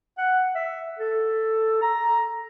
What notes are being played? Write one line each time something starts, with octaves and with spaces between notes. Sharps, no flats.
F#5
E5
A4
A#5